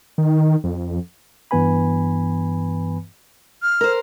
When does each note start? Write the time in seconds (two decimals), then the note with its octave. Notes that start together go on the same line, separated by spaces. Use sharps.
0.18 D#3
0.64 F2
1.51 G2 E3 B3 B4 G#5 B5
3.62 F6
3.81 A#4 C5